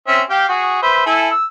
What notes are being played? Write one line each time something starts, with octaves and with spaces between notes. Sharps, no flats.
C4 C#4 E5
G4 F5 G5
F#4 G#4
B4 C5 E5
E4 A4 G#5
E6